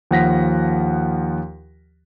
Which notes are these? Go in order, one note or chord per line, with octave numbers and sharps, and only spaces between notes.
D#2 F3 F#5 A#6 B6